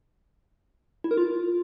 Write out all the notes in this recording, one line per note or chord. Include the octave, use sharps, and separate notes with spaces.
E4
A#4
F4